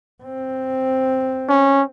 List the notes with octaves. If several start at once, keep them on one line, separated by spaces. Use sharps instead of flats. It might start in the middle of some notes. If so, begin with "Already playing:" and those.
C4
C#4